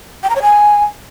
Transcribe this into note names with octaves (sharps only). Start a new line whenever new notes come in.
G5
A#5
C#5
G#5